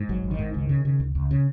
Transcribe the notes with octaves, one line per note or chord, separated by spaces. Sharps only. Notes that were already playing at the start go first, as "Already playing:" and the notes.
Already playing: G#2
G#1 F#3
G#1
D#3
G#2
C#2 D#3
C#3
C#3
C#2
C#2
C#3